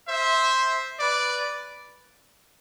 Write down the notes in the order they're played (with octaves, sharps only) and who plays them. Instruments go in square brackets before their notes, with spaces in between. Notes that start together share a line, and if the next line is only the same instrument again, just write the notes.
[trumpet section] C5 E5
B4 D5